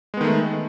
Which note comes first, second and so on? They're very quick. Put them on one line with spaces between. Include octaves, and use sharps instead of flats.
G#3 B3 D#3 A3